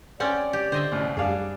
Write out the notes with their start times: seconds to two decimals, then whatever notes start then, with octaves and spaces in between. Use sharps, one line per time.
0.20 C4 C#4 A4 D5 F#5 G5
0.53 G4
0.72 D3 C5 D#5 E5
0.92 C2 F#2 A2
1.17 F#2 G3 D4 G#4 F5